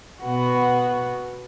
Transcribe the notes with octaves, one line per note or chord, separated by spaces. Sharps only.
B2 B3 F#4